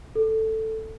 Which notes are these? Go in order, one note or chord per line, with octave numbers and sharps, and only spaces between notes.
A4